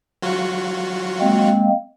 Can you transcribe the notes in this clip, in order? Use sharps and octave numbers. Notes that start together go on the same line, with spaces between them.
F#3 F4 F#4
G#3 A#3 C4